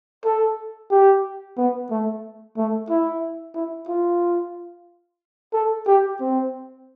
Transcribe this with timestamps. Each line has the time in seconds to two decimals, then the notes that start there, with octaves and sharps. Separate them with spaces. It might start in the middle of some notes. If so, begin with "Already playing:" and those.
0.25 A4
0.91 G4
1.58 B3
1.90 A3
2.57 A3
2.90 E4
3.55 E4
3.89 F4
5.53 A4
5.87 G4
6.20 C4